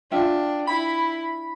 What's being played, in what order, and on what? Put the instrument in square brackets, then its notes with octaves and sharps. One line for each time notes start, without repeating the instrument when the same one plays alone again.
[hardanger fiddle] D4 [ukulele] F4 E5 G5
[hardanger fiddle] E4 [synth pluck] B5